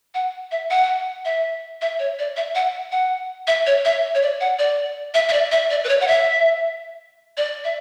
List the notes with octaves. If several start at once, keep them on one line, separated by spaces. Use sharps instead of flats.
F#5
E5
F#5
E5
E5
C#5
D5
E5
F#5
F#5
E5
C#5
E5
C#5
D5
F#5
D5
E5
E5
D5
E5
D5
B4
C#5
F#5
E5
D5
E5